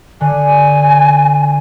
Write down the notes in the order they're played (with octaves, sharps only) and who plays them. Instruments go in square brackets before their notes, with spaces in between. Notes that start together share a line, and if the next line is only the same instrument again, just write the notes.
[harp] D3 [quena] G#5